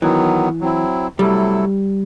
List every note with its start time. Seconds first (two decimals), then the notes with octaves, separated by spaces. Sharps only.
0.02 D#3 E3 F#3 B3
0.61 F#3 C4 E4
1.18 C3 F#3 G3 A3 E4 A4